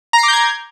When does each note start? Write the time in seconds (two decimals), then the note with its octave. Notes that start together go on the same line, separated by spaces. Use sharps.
0.13 A#5
0.18 C7
0.23 D6
0.28 G6
0.33 G#6